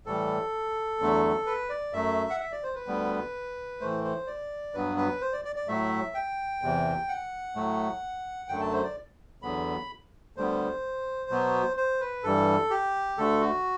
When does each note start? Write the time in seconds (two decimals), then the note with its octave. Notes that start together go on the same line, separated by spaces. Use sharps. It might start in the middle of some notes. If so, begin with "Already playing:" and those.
0.06 A2 E3 G3 A4
0.99 E2 D3 F#3 A3
1.46 B4
1.69 D5
1.93 F#2 F#3 A3 E5
2.30 F#5
2.40 E5
2.52 D5
2.63 C5
2.75 B4
2.86 D2 D3 G3 B3
3.80 A2 E3 A3 C5
4.04 C5
4.27 D5
4.74 G2 F#3 B3 B4
4.97 B4
5.21 C5
5.33 D5
5.45 D5
5.56 D5
5.68 A2 F#3 A3 E5
6.15 G5
6.62 E2 C3 E3
7.08 F#5
7.55 A2 F#3 A3
8.49 F#2 D3 F#3 A3 G5
8.61 A5
8.73 C5
8.84 D5
9.42 E2 D3 F#3 B3 B5
10.36 D2 D3 G3 B3 C5
11.30 B2 F#3 B3
11.77 C5
12.01 B4
12.23 G2 E3 G3 A4
12.70 G4
13.17 D2 D3 A3 A4
13.41 F#4